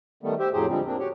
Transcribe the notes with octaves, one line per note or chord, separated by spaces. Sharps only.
D#3 G3 A3 B3
G4 C5 E5
F2 A2 F#3 G4 G#4 C5
D3 F3 G3 G#3 C4
A#3 C4 D4
F#4 G4 C#5